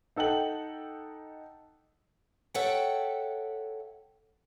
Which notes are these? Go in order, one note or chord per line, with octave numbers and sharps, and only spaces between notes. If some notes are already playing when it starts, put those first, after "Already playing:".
D#4 A4 F#5 G5 F#7
A4 C#5 E5 F#5 G5